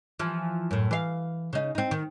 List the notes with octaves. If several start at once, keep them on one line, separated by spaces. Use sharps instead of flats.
E3 F3
F#2 A2
E3 F5
C#3 D#4
C4 D#4
D#3